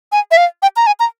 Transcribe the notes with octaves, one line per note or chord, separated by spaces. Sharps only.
G#5
E5
F5
G5
A#5
G#5
A#5